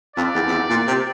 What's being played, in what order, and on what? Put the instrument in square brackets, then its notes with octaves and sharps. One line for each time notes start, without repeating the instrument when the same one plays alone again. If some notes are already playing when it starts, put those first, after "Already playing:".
[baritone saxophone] F2 [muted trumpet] D5
[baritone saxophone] E2
F2
E2
A#2
C3